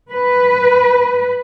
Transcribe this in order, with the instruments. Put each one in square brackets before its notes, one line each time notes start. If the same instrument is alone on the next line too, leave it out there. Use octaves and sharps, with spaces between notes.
[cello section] B4